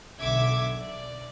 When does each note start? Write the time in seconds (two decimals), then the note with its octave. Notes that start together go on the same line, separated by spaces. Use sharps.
0.19 B1 D3 E5 D6 G#6
0.79 D5